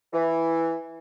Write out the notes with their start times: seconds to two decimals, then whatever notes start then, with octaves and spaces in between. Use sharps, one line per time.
0.13 E3